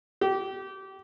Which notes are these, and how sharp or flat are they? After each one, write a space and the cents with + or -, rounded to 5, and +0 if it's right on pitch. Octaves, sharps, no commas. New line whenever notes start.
G4 -25